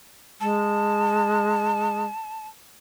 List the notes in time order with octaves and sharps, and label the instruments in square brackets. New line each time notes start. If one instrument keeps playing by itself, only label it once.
[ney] G#3 [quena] A5